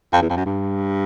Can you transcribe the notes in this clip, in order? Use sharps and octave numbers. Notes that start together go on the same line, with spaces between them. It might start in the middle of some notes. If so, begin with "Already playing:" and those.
F2
E2
F2
F#2
G2